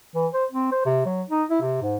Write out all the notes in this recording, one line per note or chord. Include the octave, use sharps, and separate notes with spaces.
E3
C5
C4
C5
C3
F#3
D#4
E4
C3
G#2